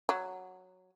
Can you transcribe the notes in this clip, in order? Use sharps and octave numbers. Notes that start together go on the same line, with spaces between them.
F#3